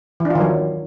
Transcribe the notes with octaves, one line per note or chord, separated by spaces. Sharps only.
E3
D4
F4
D#3
F#3